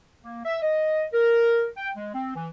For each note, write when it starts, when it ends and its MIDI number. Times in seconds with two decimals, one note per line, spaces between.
0.23 0.41 58
0.45 0.61 76
0.62 1.05 75
1.13 1.67 70
1.77 1.91 79
1.96 2.12 56
2.14 2.35 60
2.36 2.49 52